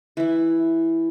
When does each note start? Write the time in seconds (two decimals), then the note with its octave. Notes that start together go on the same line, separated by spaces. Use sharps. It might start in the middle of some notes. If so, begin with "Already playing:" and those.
0.17 E3 E4